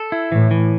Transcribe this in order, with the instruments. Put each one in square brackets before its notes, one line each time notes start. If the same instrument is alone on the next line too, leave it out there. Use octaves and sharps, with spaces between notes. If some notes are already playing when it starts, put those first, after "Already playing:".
Already playing: [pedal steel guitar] A4
E4
[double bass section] A2 [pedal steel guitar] E3
[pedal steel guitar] E3